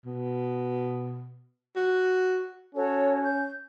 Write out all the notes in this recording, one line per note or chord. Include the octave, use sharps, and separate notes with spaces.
B2
F#4
C#4 F#4 A4 C#5
G6